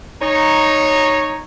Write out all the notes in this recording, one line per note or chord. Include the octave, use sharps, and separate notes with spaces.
D#4 C#5